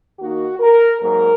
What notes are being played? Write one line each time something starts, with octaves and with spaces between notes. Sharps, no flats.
D#3 A#3 D#4 F#4
A#4
G#2 F#3 A#3 A#4